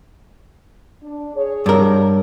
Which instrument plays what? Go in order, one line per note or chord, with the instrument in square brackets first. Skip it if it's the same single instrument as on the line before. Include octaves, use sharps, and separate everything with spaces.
[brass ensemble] D4
G#4 C#5
[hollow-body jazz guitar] G2 A#4